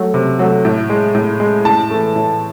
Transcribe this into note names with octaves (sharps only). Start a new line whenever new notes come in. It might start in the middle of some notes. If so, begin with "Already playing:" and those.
Already playing: F#3 A3
C3
F#3 A3
A2
G#3
A2
G#3
A2 A5
E3 A3
A2